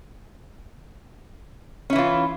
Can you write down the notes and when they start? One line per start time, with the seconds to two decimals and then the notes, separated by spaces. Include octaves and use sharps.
1.90 C#4
1.93 E4
1.96 E3
1.98 F4